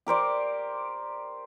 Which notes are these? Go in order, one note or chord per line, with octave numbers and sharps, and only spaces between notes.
G4 A#4 C5 D5